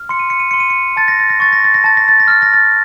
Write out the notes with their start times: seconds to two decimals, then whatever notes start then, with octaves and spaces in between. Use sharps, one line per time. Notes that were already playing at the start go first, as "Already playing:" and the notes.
Already playing: F6
0.09 C6 C#7
0.19 D#7
0.30 C#7
0.40 D#7
0.51 C6 C#7
0.60 D#7
0.70 C#7
0.97 A5 A6
1.08 A#6
1.20 A6
1.30 A#6
1.40 C#6 A6
1.52 A#6
1.64 A6
1.74 A#6
1.84 A5 A6
1.97 A#6
2.08 A6
2.20 A#6
2.28 F6 A6
2.42 A#6
2.54 A6